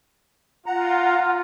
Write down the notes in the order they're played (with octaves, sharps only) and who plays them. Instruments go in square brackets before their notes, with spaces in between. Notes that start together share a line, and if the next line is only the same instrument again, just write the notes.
[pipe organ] F4 [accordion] F#5 A#5